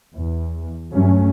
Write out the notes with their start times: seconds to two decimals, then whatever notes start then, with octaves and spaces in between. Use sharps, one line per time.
0.13 E2
0.92 G2 F#3 A3 C#4